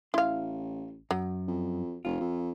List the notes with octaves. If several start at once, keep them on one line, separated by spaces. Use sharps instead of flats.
A1 E4 F5 C6
F#2 F#3
F2
F1 F4
F2